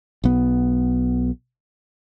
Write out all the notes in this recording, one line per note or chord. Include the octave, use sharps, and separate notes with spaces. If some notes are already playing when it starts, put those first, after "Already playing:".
B1 B3